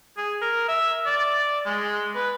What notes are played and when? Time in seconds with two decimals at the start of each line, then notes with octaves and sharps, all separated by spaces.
0.17 G#4
0.41 A#4
0.68 E5
1.06 D5
1.66 G#3
2.15 B4